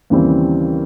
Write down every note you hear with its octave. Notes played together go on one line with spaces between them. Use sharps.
D#2 C#3 E3 G3 C4